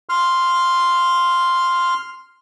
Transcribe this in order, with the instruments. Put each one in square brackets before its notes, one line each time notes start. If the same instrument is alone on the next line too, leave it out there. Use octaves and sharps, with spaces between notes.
[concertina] C6 F6